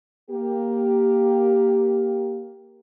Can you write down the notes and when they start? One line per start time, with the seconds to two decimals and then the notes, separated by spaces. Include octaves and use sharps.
0.30 A#3 G4